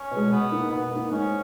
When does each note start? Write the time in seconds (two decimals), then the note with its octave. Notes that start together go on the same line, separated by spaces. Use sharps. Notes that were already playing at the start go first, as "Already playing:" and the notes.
Already playing: C#4
0.11 B2 G#3
0.31 B2 B3
0.51 A#3 D#4
0.71 B2 B3
0.91 A#3 D#4
1.11 G#2 C#4